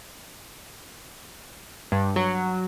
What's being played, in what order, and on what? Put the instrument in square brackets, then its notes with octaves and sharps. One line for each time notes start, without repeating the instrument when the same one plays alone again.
[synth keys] G2
F#3